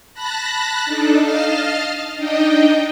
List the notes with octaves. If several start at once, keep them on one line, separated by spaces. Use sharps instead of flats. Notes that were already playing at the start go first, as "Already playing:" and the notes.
A5 B5 F#6 A#6
D4 D#4 A4
D#5 F5 A5 F6
D4 D#4 D#5 G5